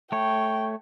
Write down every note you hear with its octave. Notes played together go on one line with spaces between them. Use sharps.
A3 C#5 G5